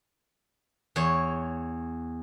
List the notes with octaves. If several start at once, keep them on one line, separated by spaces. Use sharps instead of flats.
E2 C#5